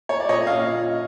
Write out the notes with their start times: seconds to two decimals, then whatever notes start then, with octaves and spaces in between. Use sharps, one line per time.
0.09 C#5
0.20 D5
0.29 A#2 C#5 D#5
0.47 D#5 F5
0.52 A#2